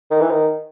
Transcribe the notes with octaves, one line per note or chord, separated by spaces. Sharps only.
D#3
E3
D#3